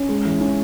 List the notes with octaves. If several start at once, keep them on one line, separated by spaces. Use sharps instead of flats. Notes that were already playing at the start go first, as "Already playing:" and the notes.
Already playing: C#4
G#3
E3
C#4